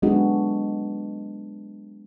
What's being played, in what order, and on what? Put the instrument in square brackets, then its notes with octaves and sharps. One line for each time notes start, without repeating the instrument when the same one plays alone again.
[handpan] F#3 G#3 B3 D4 D#4 F#4